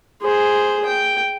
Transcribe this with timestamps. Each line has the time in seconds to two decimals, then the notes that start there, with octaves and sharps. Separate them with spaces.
0.22 G#4 C5
0.86 G5